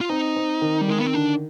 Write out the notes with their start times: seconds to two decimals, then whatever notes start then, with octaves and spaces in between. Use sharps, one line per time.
0.01 F4
0.09 C4 D#4
0.36 C4
0.61 D#3
0.81 G3
0.88 D#3 G#3
0.98 B3
1.06 C4
1.14 D3 D4